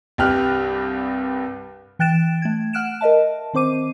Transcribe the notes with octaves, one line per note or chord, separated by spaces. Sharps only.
C2 G2 G4 F6 F#6
E3 G5 F#6 A6 D7 E7
A3 G#6
F#5 F6 F#6 D7 E7
A#4 D#5 E5 A5
D#3 C4 C5 D6 D#7